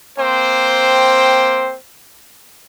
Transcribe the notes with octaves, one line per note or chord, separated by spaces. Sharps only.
A#3 C4 C5 G5